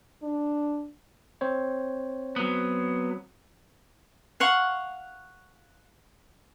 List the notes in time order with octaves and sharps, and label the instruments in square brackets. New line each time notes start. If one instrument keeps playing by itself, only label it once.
[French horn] D4
[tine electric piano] C4 C5 C#5
[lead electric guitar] F#3 B3
[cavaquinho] F5 F#5 C#6